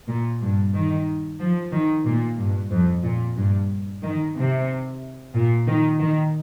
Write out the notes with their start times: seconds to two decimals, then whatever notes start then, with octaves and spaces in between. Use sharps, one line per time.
0.08 A#2
0.41 G2
0.74 D#3
1.40 F3
1.72 D#3
2.05 A#2
2.38 G2
2.72 F2
3.04 A#2
3.37 G2
4.02 D#3
4.36 C3
5.34 A#2
5.68 D#3
5.99 D#3